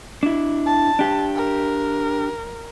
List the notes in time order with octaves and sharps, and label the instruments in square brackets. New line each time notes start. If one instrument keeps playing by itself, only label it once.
[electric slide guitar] D4 E4
[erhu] A5
[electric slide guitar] D4 G4
[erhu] A#4